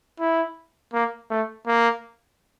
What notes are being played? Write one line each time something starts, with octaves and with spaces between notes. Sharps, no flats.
E4
A#3
A3
A#3